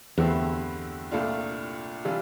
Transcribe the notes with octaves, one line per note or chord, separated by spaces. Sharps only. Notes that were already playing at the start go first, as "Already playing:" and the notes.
E2 G2 D3 A3 C4 E4
C2 A#2 A3 D4 F4
C3 E3 G3 D4 F4